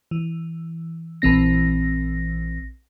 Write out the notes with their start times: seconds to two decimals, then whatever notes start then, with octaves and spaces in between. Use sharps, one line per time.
0.11 E3
1.22 A#1 E3 C4 A#6